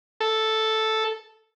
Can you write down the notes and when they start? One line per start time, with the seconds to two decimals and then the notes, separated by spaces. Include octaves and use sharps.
0.20 A4